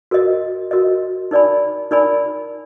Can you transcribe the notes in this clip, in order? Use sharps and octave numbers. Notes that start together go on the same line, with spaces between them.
F#4 A#4 D#5
F#4 A#4 D#5
D#4 A#4 D5 G#5 B5
D#4 A#4 D5 G#5 B5